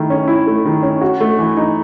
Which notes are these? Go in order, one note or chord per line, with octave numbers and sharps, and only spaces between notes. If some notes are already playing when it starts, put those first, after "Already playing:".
Already playing: D#3 A3 E4
C#4
E4
A3
D#3
C#4
F#4
A3
E3
D#4